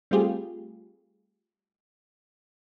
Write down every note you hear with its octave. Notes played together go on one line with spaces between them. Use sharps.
G3 A3 C4 F4 G4 G#4